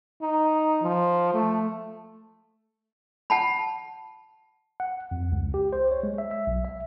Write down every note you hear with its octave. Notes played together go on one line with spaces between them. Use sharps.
D#4
F3
A3
F#5 A5 B5
F#5
F2
C#2
G4
C5
C#5
G#3
E5
E5
B1
E5